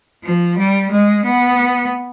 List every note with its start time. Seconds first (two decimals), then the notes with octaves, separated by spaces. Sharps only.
0.23 F3
0.57 G3
0.91 G#3
1.24 B3